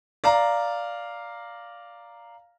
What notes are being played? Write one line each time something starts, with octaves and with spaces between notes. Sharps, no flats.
D5 F5 A#5